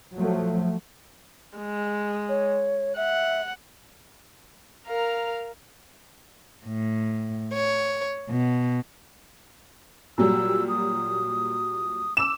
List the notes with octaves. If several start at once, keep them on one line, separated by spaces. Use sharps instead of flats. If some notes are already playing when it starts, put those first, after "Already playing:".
F3 F#3 A3
G#3
C#5
E5 F#5
A#4 F5 A#5
A2
C#5
B2
A#2 F#3 G3 E6
D#6
D6 E6 E7